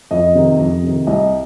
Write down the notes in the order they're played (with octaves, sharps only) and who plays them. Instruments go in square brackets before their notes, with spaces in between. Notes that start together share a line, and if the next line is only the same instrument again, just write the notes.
[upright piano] F2 D#5
C3 D#3
F2
C3 D#3
C2 D#5